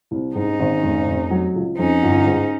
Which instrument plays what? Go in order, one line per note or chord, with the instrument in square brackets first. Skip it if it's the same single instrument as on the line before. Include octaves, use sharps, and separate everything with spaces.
[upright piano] C2
[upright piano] G#2 [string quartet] C#4 D#4
[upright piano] G#1
F1
F1
F#3
C#2
[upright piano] F2 [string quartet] C#4 D#4
[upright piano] G1
G#2